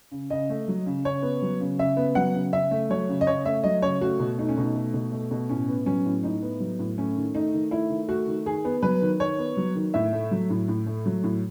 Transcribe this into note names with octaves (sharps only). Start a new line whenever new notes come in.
C#3
C#3 D#5
A3
F#3
C#3
C#3 C#5
B3
F#3
C#3
C#3 E5
B3
F#3 F#5
C#3
C#3 E5
A3
F#3 C#5
C#3
D#5
C#3 C#5
A3 E5
F#3 D#5
C#3 C#5
A3 F#4
B2
A3 D#4
C#4
B2 D#4
A3
B2
A3
B2
A2 C#4
B3
F#3 C#4
A2
A2 D#4
B3
F#3
A2
A3 C#4
D#3
A3 D#4
D#3
A3 E4
D#3
A3 F#4
D#3
D#3 G#4
B3
F#3 B4
D#3
D#3 C#5
B3
F#3
D#3
A2 E5
A3
F#3
A2
A2
A3
F#3
A2